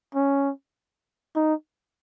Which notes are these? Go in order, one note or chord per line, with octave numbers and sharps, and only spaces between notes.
C#4
D#4